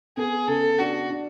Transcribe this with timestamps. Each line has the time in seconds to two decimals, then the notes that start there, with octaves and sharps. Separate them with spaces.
0.17 B3 G#4
0.47 C#3 A4
0.79 D4 F#4
1.10 D4